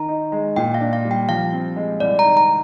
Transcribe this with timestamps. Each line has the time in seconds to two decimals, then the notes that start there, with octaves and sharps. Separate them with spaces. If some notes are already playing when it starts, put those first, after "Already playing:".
Already playing: D#3 A#5
0.08 D#4
0.32 G#3
0.56 A#2 G5
0.74 F5
0.81 D4
0.93 F5
1.05 G3
1.11 G5
1.29 F3 F5
1.53 C4
1.76 G#3
2.00 C2 D5
2.19 A#5
2.24 D#3
2.37 A#5